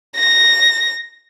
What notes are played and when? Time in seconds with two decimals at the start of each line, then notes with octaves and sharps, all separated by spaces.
0.17 A#6